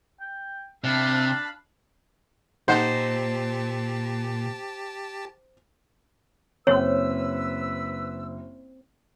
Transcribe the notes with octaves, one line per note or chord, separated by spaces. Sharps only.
G5
C3 D4 F5 A5 B5
A#2 D#4 G4 C5 F#5 A5
F#1 C4 B4 C#5 E6